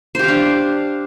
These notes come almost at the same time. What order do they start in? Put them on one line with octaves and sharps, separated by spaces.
C5 G4 F5 D4